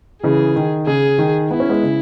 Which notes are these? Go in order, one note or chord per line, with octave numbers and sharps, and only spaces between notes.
C#3 E3 G#4
D#3
C#3 G#4
D#3
B3 E4
C#4
G#3 B3
C#3